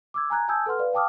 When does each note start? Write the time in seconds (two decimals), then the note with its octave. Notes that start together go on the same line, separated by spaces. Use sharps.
0.14 D6 E6 G#6
0.30 G#5 A#5 F#6 G#6
0.48 G#5 A5 D#6 E6 G6 G#6
0.66 A4 B4 F#5 C6 F6
0.79 B4 D5 F5
0.93 F5 G5 A5 D6 D#6 F6